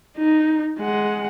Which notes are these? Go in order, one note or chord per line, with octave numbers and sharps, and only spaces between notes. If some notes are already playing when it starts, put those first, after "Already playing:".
D#4
G#3 F#5